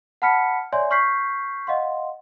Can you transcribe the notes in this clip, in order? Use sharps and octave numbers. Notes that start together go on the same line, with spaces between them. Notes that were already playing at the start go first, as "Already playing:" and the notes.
F#5 A5 B5 F6 B6 C#7
C#5 D5 E5 G#5 C6
C#6 F6 G6 B6 C7
D#5 F5 F#5 C6